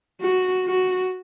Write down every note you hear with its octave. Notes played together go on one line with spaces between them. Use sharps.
F#4
F#4